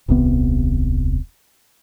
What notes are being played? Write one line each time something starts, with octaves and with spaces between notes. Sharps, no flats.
D#1 C2 C3 B3